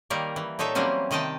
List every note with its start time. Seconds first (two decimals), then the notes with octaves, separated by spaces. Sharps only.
0.10 D#3 G3 A#3 A#4
0.36 E3
0.59 A#2 D#4 A4 C#5 E5
0.75 E3 F#3 G3 A#3 C4 C#4
1.11 C3 D#3 D#5 G5 A5